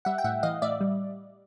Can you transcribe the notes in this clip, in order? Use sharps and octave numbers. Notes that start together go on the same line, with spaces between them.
G3 E5 F#5
G5
A2 E5 F#5
E3 D#5 F5
A2 D5 E5
G3